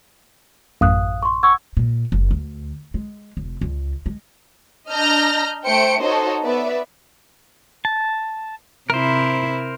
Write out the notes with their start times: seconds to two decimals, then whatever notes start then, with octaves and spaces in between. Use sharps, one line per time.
0.81 A1 F#2 F5 D#6 F#6
1.22 C6 C#6
1.43 F#5 C#6 E6 G#6
1.77 A#2
2.12 F#1
2.31 D2
2.94 G#3
3.37 F1
3.61 C#2
4.06 G#3
4.89 D4 D#5 A#5 F6 G6 A#6
5.65 A3 C5 G5 C#7 D7
6.01 D#4 F#4 A4 C5 C#5 D#5
6.42 B3 B4 D5 E5
7.85 A5
8.90 C3 E4 A#4 C5